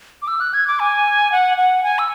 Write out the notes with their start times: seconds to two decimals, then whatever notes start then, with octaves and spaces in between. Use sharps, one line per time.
0.22 D6
0.28 E6
0.40 F#6
0.54 G#6
0.67 D6
0.80 G#5
1.32 F#5
1.57 F#5
1.83 G#5
1.99 E6